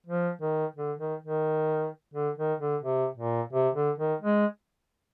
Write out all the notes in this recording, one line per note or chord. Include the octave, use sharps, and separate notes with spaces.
F3
D#3
D3
D#3
D#3
D3
D#3
D3
C3
A#2
C3
D3
D#3
G#3